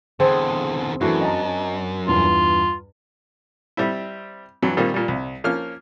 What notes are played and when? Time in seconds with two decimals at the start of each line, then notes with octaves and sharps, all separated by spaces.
0.20 E2 D3 C4 G#4 A5
1.01 F#2 E3 A3 D4 E4 F#4
1.21 D#5 A5 A#5
2.07 E2 G2 F4
3.77 G3 C4 E4
4.62 G2 E3 F#3
4.77 A#2 D#3 G3 A#3 C4
4.94 A#2 G3
5.08 C2
5.44 F3 A#3 C#4 F6